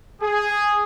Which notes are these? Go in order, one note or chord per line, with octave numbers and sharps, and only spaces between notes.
G#4